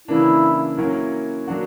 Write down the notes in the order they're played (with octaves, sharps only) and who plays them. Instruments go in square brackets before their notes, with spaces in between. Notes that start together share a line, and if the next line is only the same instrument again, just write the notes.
[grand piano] C#3 E3 A#3 D4 [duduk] E4
[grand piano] F#3 A#3 C#4 E4 A#4
F#3 A#3 D4 F#4